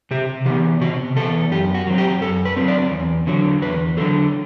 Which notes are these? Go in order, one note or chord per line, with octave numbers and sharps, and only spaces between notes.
C3 G4
E3 B3 G4
C3 F#4
E3 B3 A4
F#2 G4
F#4
F#3 C4
G4
F#2 A4
B4
F#3 C4
D5
E2
D3 F#3
E2 B4
D3 F#3 A4